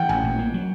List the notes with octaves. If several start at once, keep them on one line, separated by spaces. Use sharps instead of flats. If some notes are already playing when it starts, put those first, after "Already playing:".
Already playing: E3 F#5 G5
A1 G#5
A#2
A#3
F#3